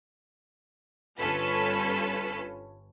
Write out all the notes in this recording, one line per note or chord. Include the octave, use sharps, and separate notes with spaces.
G1 C#4 F4 A4 B4 B6